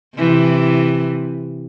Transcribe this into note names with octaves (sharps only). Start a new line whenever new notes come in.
C3 E3